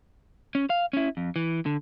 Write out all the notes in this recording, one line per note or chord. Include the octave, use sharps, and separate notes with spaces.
C#4
F5
C#4 E4
F2
E3
D3